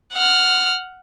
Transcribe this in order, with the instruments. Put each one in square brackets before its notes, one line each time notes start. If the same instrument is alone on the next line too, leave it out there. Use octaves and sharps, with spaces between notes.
[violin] F#5 F6